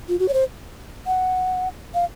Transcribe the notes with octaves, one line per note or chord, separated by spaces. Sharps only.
F4
F#4
C#5
C5
F#5
F5